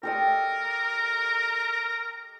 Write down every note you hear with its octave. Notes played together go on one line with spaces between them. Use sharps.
G4 A4 A#4 D#5